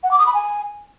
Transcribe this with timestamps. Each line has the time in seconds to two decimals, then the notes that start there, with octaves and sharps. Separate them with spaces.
0.03 F#5
0.11 D6
0.19 D#6
0.26 B5
0.34 G#5